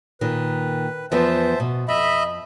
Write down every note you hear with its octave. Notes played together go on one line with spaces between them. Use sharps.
A#2 D#3 B4
E2 F3 B3 C5 E5 A5
B2
F2 D#5 E5 B5